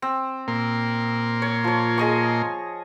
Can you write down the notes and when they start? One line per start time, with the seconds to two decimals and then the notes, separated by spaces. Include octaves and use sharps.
0.02 C4
0.48 A#2 A#3 C6
1.42 C#5
1.64 F3 C#5
1.98 G#4 D#5 C#6